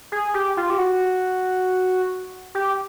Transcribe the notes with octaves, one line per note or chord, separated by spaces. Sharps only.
G#4
G4
F4
G4
F#4
G4